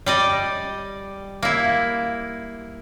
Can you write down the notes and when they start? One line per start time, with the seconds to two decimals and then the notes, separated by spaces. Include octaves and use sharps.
0.06 G3 D5 D#5
1.43 A#3 E4